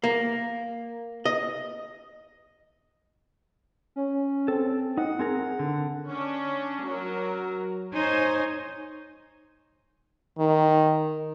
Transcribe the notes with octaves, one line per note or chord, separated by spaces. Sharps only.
A#3
D#5
C#4
C4 A4
D#4 F#5
C4 G#4 A#4
D3
C#4 D4
F#3 A#4
D#4 C5 C#5 G#5 C6
D#3